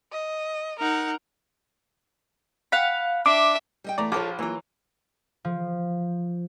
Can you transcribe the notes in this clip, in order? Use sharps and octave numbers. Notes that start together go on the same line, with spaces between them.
D#5
D#4 A#4 F#5
F5 F#5 B5
D4 E5 D6
G3 D#5 G5
E3 A3 B3 D5 A#5
A#1 F3 F4 A4 C#5 D6
E3 F#3 A#3 F4
F3